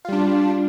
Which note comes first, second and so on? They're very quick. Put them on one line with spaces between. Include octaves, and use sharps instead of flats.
F4 G3 D4